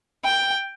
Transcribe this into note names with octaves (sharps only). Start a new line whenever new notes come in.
G5